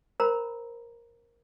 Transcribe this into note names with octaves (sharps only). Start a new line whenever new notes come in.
A#4 C5 A#5 B5